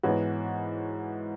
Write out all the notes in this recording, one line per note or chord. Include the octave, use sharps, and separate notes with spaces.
G#2 E3 B3 F#4 C#5